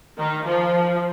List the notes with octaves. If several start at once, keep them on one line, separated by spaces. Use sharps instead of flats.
D#3
F3